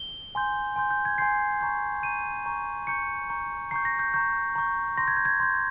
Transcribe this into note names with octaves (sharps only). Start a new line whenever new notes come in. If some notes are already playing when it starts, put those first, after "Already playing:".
Already playing: G7
G#5 C6 G6
G#5 C6 G6
G6
G#6
G#5 C6 G6 C7
A#5 C#6 G6
A#5 C#6 G6 D#7
A#5 C#6 G6
A#5 C#6 G6 C#7
A#5 C#6 G6
A#5 C#6 G6 C7
A#6
G6
A#5 C#6 G6
A#5 C#6 G6
C6 A#6
G6 G#6
G6
G#6
C6 G6